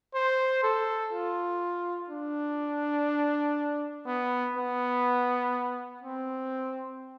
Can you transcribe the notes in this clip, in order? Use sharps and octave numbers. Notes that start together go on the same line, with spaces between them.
C5
A4
F4
D4
B3
B3
C4